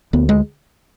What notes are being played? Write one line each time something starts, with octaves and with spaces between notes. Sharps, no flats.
D2 B3
G#3